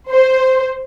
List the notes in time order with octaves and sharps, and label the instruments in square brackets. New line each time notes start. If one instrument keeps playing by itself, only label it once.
[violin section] C5